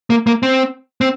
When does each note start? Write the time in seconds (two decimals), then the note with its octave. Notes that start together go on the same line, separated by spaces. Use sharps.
0.10 A#3
0.27 A#3
0.43 C4
1.01 C4